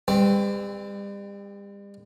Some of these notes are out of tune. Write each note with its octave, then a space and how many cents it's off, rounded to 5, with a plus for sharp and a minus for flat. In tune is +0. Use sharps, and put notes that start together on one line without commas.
G3 +40 C4 +0 B4 +40